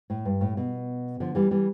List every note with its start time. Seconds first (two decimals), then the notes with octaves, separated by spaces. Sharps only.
0.10 A2
0.25 G2
0.41 A2
0.57 B2
1.20 D3 F3
1.35 E3 G3
1.51 E3 G3